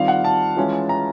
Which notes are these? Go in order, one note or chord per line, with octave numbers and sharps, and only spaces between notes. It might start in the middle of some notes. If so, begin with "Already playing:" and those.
Already playing: D#3 G3 C4 F4 F5
F#5
A5
E3 G#3 C#4 F4
A#5